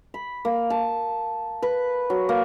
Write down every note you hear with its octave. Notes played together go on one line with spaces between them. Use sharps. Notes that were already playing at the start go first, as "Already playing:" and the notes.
B5
A#3
A5
B4
F#3
A#3